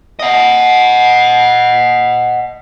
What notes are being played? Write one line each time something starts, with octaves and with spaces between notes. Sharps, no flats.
D#5 F#5